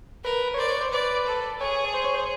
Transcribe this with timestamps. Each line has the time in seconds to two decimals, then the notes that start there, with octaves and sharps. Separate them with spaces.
0.24 A#4 B4
0.54 C#5
0.58 C5 D5
0.69 C#5
0.81 C5
0.92 B4 D5
1.26 A4
1.60 G#4 C#5
1.94 C5
2.04 C#5
2.15 C5